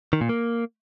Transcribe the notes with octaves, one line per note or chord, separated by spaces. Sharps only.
D#3
A#2
A#3